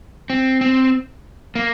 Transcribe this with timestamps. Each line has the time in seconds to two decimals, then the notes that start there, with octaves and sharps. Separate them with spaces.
0.30 C4
0.61 C4
1.55 A#3